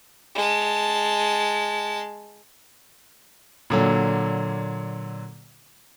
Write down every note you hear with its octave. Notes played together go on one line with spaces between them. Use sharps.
G#3 A5
A#2 D3 F#3